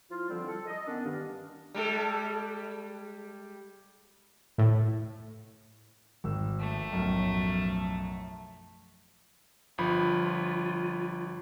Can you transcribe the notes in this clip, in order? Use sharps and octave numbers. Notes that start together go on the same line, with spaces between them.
F3 E4 F4
D3 F3 G3 C4
A4
D#5
D#3 B3 C#4 D4
G2 D#3 D4 F5
G3 G#3 A4
A2
G#1 E6
F3 A3
B1 F#2 A2
G1 F3 F4 B5